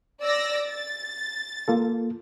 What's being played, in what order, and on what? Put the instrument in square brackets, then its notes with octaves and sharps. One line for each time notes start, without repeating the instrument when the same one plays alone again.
[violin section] D5 E6 A#6
A6
[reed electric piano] A#3 F4 A4